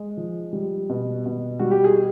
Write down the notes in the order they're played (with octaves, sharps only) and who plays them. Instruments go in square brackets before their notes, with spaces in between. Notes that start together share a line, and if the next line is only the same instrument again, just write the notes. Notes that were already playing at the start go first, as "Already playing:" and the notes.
Already playing: [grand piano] G#3
F3
G3
B2
B2
G3 F#4
G4
G#4